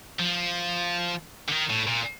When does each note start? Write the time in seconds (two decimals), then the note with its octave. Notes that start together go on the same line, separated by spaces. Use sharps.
0.19 F3
1.48 D3
1.51 D#3
1.70 A2
1.87 A#2